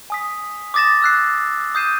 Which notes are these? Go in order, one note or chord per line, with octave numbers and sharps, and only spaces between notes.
G#5 D#6 B6
D6 D#6 A6 A#6 E7
E6 F#6 C7
D#6 G6 C7 D#7 E7